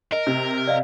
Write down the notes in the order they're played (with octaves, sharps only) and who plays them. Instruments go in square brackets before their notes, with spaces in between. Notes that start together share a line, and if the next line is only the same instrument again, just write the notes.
[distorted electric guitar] A#4 [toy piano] D#5
[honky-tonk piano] C3
[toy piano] D5 D#5 F5